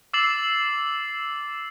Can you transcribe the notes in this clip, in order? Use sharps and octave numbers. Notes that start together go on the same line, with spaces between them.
D6 E6 A6 C7 E7 F#7